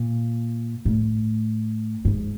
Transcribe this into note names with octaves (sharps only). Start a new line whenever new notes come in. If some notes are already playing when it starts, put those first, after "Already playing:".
Already playing: A#2
A2
G#2